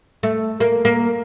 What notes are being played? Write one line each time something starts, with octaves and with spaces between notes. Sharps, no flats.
A3
A#3
A#3